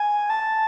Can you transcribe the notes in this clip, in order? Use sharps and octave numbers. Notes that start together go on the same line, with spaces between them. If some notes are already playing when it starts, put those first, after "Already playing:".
Already playing: G#5
A5